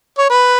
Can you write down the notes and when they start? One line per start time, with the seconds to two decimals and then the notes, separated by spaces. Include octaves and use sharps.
0.18 C#5
0.30 B4